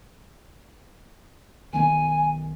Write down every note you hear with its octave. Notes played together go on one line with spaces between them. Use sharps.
B1 D#3 B3 G#5